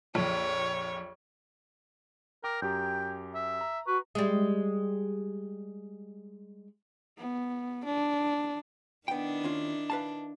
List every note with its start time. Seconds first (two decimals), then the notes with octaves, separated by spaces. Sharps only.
0.15 A#1 F2 C#5
2.44 A#4 G5 A#5 D6
2.62 F#2 G4 G5 A#5
3.35 E5
3.61 A#5
3.87 F#4 B4 C#6
4.15 G3 G#3
7.18 B3
7.85 D4
9.08 D#3 B3 D4 E4 G5
9.43 D#2 C#4 F4
9.90 B4 F5 A5